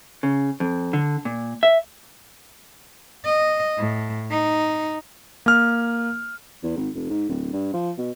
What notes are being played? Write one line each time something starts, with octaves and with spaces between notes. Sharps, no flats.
C#3
F2
D3
A#2
E5
D#5
A2
D#4
A#3 F6
E2
G#1
F1
G#2
D1
G2
F3
B2